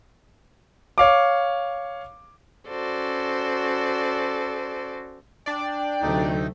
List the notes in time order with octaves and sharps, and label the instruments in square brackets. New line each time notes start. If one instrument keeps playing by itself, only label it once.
[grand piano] C#5 F5 D6
[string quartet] C#4 F#4 A4 C5 D5
[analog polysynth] D4 D5 [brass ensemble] G5
[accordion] D2 D#4 [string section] C3 F#3 A3